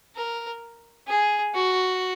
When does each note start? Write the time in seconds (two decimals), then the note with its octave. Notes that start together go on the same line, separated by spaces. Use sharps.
0.16 A#4
1.08 G#4
1.55 F#4